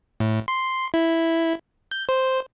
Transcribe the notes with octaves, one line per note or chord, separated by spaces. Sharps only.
A2
C6
E4
G6
C5